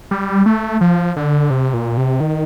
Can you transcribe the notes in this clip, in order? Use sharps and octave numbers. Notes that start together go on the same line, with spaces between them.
G3
A3
F3
D3
C3
A#2
C3
D#3